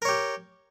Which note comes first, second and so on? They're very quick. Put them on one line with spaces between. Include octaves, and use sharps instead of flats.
A#4 C#5 G4